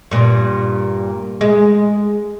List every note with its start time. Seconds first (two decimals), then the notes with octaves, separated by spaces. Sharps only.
0.11 G2 A#2
1.41 G#3